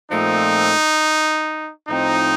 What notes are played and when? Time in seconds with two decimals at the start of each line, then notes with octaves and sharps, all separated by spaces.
0.11 A#2 F3 A3 C4 D#4
1.88 A2 F3 C4 D#4